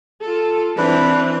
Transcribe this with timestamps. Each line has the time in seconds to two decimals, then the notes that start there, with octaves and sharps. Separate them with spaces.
0.21 F4 A4
0.78 E3 C4 D4 B4